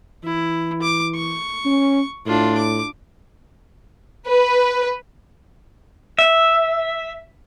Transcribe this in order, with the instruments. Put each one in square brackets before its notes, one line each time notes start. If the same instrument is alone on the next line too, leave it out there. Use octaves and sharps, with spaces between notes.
[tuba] E3 [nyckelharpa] E4
[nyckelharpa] D6
C#6
[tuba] C#4
[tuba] A2 [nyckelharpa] D4 F4
[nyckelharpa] D6
[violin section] B4
[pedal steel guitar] E5